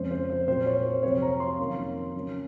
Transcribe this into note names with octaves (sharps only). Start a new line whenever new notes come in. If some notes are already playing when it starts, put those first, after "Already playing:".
Already playing: F2 C#3 G#3 C#4 C5
C5
C5
A#2 F#3 C4 C5
C#5
C5
F2 C3 F#3 C4 C#5
A#5
C6
F2 D#3 F#3 A#3 C#4
C#3 F#3 A#3 C#4